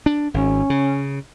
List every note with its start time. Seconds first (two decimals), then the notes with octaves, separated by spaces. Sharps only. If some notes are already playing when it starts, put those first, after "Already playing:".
0.06 D4
0.34 G#1 C#4
0.70 C#3